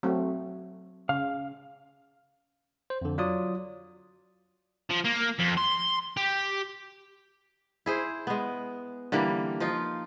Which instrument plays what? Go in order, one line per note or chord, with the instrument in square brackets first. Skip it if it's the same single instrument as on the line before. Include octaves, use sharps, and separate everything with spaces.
[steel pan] F#3 A3 C4
[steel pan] C#3 [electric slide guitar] F5
[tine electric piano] C5
F2 D3
F#3 F4 D5 D#6
[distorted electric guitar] F3
A#3
F2
C6
G4
[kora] E4 G#4 C5
G#3 B3
D3 E3 G3 A#3
F3 D#4 F4